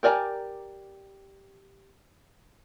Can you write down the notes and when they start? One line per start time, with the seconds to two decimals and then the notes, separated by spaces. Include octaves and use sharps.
0.03 G4 A#4 D5 G#5 A#5